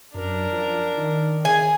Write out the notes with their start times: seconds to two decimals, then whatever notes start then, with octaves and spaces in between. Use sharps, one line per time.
0.14 F#2 D4 A#4
0.52 F3
0.97 D#3
1.45 G#4 G#5